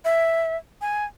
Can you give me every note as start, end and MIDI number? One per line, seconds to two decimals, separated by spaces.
0.05 0.57 76
0.81 1.05 80